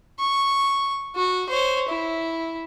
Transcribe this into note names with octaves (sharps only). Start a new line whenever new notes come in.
C#6
F#4
C5 C#5
E4